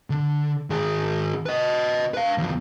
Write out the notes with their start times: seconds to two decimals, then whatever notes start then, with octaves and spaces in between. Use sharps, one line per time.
0.10 D3
0.70 D#3 G#4
1.46 B4 D#5
2.14 B4 F5
2.38 D#2 F3